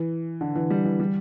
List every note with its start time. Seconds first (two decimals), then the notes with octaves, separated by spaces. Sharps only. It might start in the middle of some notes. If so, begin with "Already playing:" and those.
Already playing: E3
0.41 D3
0.56 E3
0.70 G3
0.84 E3
1.00 G3